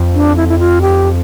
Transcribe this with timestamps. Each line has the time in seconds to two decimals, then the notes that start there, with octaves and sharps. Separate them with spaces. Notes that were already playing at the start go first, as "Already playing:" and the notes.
Already playing: F2
0.15 D4
0.37 E4
0.48 E4
0.59 F4
0.82 G4